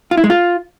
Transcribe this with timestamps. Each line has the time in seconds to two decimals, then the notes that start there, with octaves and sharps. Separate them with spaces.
0.11 F4
0.17 E4
0.24 G#3
0.30 F4